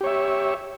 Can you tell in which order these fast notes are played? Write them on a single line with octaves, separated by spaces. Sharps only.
G4 C#5 E5